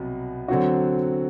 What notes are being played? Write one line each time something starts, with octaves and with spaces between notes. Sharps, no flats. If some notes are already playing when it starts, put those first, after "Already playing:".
Already playing: C2 B2 F#3 B3
D3 F#3 C4 F#4